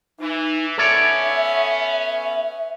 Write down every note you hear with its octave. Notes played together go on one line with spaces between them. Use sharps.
E3 D#4
B3 C#4 A4 C#5 D5 E5